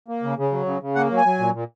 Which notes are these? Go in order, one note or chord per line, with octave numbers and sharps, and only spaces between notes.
A#3
C#3
C#3
F#3
C#3
C#3
A#3 F#5
F#3
G#5
F#3
A#2
A#2